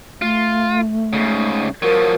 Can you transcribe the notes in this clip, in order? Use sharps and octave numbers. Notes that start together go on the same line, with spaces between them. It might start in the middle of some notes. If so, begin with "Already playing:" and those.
A3 F4
G#2 C#3
F3 F#3 A#4